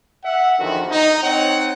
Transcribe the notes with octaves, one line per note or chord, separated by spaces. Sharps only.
E5 F#5
E2 D3 D#3 F3 F#4
D#4
C4 D#4 C#5 F#5